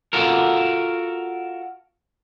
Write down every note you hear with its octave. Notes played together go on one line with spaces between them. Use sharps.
F4 F#4 A4 A#4